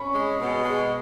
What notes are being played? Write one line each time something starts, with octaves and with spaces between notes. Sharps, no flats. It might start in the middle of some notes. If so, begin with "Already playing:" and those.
Already playing: C#4 B5 C#6
G#3
B2
G#3